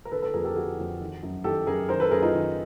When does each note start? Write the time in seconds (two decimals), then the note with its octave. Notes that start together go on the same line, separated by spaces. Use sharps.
0.05 A#4
0.12 D3 A4 B4
0.22 A4 B4
0.34 F2 G#4 A#4
0.44 G4 A4
0.56 D3 F#4 G#4
0.79 F2
1.01 D#3
1.23 F#2
1.44 D#3 G4 A4
1.66 F#2 G#4 A#4
1.89 D#3 A#4 C5
2.00 A4 B4
2.11 F#2 G#4 A#4
2.22 D#4 F4
2.34 D#3